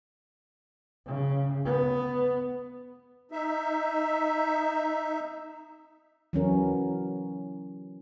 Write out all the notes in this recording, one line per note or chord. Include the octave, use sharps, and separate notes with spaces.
C#3
B3
D#4 E5
E3 F#3 C#4 A#4